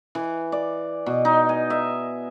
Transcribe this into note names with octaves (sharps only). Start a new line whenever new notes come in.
E3
D5
B2
D#4
G#5
E5